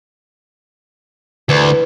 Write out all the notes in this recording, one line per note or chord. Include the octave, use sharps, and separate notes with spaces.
D2 E3